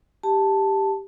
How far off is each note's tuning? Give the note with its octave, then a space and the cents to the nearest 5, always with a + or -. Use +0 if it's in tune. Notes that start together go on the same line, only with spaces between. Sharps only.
G4 +0 A5 +0